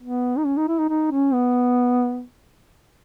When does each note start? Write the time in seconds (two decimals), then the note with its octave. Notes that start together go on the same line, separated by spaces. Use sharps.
0.02 B3
0.38 D#4
0.46 C#4
0.57 D#4
0.68 E4
0.79 D#4
0.89 D#4
1.11 C#4
1.33 B3